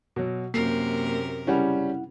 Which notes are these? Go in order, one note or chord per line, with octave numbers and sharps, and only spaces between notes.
B2 F#3
F#2 C3 A#3 A#4 C7
C#3 G3 C#4 E4 F#5